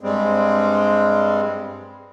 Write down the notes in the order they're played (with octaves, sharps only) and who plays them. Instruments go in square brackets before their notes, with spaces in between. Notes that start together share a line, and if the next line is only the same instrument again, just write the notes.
[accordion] G2 G3 G#3 C4